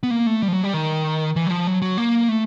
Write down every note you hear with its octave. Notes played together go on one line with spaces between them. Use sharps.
B3
A#3
A3
G3
F3
F#3
G3
D#3
E3
F#3
F3
F#3
F#3
A#3
A3